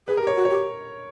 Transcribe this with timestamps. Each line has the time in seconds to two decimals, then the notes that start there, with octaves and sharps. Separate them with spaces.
0.08 G#4 B4
0.17 A#4
0.21 G4
0.27 C#5
0.35 F#4
0.45 G4 C#5